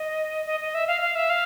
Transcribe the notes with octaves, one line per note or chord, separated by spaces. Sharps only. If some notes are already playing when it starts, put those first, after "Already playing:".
Already playing: D#5
D#5
D#5
E5
F5
F5
E5
F5